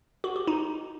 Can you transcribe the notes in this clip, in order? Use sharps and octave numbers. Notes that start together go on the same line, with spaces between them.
F#4
G4
D#4